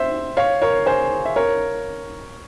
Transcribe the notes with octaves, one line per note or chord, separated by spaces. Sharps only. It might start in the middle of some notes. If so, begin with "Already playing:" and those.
Already playing: C5 E5
C#5 F5
A#4 C#5
G#4 C5
E5
A#4 C#5